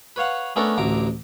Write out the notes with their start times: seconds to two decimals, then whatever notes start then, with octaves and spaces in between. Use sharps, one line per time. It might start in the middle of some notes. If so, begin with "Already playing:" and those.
0.16 B4 C#5 F5 F#5
0.56 A3 B3 C#4 D4 A4 A#4
0.78 A1 D2 D3 A#5 D6